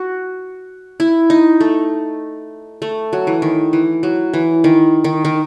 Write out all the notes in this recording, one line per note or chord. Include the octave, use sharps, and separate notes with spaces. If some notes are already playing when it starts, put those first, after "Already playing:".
Already playing: F#4
E4
D#4
A3
A3
F#3
E3
D#3
E3
F#3
E3
D#3
D#3
D#3